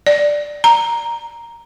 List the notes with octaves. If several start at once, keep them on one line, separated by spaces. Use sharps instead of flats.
D5
A#5